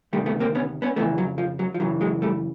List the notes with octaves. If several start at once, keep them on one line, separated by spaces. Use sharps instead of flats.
D2 C3 D#3 G3 A3
A3 B3
A#3 C4
B3 C#4
B3 C#4
F2 C#3 E3 A3 B3
F#3
F3
F#3
F3
F#2 C#3 E3 F#3
F#3 G#3
G3 A3